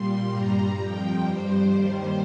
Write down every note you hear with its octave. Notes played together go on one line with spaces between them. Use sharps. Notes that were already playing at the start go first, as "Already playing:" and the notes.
Already playing: A#2 G3 C6
G2 G3 A#5
F2 F3 G5
G2 G3 C5
D#2 D#3 G3 C5